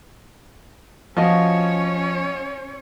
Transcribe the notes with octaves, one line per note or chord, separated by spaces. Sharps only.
F3 C#4 F4 F#4 C#5 D#5